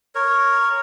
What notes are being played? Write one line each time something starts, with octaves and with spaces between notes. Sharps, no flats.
A#4 C#5